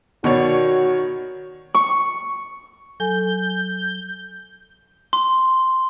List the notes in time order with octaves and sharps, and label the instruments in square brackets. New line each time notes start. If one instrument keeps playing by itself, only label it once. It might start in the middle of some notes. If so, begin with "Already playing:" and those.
[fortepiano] B2 D5 [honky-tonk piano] D#3 C#5 [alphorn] F#4
[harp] C#6
[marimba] F#3 A4 G#5 [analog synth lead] G6
[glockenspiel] C6